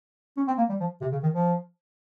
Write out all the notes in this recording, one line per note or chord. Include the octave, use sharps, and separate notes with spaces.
C#4
C4
A#3
G3
F3
C3
C#3
D#3
F3